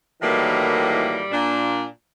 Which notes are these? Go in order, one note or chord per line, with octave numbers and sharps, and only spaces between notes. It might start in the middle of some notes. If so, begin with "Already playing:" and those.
A2 D#3 E3 F#3 G3 A#3
A#2 D4